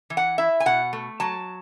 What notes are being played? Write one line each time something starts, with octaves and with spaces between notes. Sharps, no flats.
E3
F#5
E4 E5
G#5
B2 F#5
A3
F#3 A5